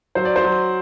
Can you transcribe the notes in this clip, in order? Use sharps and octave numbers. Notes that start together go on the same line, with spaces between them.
F#3 C5
D5
C5
F#3